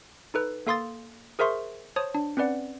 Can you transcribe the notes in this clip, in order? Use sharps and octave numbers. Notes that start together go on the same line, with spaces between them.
D#4 A4 B4
A#3 A4 F5 C6 D#6 A6
G#4 A#4 C5 E5 C6 C#6
C5 C#5 A5 D#6
D4
C4 C#4 B4 D5 F#5